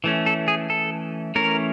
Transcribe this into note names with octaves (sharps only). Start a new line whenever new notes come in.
E3 A3 C#4
A4
G#4
A4
E3 A3 C#4 A#4